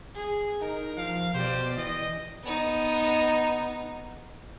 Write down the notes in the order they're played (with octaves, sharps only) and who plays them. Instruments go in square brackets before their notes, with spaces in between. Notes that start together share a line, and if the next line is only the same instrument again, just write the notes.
[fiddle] G#4
[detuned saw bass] D#4 [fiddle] A#4
[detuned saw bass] F3 [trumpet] F5
[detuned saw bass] B2 [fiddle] G4 D5 [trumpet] C5
[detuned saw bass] E3 [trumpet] D#5
[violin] B3 D#4